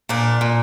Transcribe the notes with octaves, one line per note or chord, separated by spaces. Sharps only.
A#2 D4
A#2